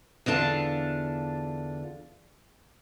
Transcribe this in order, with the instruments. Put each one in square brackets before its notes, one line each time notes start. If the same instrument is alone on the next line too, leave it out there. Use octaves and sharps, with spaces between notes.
[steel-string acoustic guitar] E2 D3 D4 F4 A5